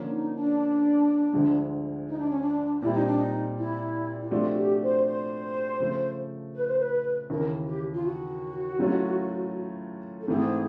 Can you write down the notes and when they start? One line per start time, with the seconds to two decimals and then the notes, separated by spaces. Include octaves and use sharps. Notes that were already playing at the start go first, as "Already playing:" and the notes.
Already playing: D3 F3 A#3 C#4
0.09 D#4
0.33 D4
1.33 D2 D3 F3 G#3
2.08 D#4
2.18 D4
2.29 C#4
2.40 D4
2.82 A#2 G3 C4 E4
2.94 D#4
3.05 D4
3.16 D#4
3.57 E4
4.20 E4
4.31 C3 F3 A3 D4 F4 F#4
4.57 G4
4.81 C5
5.06 C5
5.80 C#3 F3 A3
6.55 B4
6.68 C5
6.79 B4
7.30 D#2 C#3 E3 A#4
7.66 G4
7.93 F4
8.05 F#4
8.79 A2 F#3 A3 C#4 F4
10.21 A4
10.28 G#2 E3 A3 C4 G#4